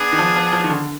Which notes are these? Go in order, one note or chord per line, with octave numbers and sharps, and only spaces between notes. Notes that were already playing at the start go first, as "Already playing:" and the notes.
Already playing: B3 D4 G#4
D#3
F3
F3
F3
D#3
D3